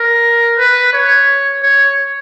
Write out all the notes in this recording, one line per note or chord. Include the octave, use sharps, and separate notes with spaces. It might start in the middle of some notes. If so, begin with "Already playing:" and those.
Already playing: A#4
B4
C#5
C#5